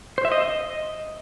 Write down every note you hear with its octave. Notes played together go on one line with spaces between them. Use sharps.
C5
E5
D#5